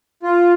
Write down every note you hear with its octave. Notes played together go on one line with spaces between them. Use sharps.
F4